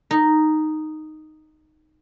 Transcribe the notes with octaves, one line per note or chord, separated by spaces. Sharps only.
D#4